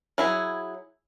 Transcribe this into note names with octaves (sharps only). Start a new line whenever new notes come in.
F#3 E4 G#4